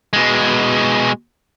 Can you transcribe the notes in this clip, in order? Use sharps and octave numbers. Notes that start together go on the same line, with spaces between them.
B2 G#3